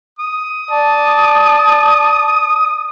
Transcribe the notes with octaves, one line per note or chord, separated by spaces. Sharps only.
D#6
D5 A5